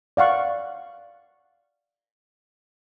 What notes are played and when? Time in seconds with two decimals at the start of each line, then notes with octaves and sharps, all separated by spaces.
0.17 D5 F5 F#5 C#6